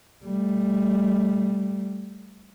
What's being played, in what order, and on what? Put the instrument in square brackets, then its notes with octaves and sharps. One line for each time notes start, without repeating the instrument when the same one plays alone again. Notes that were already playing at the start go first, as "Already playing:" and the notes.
[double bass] G3 A3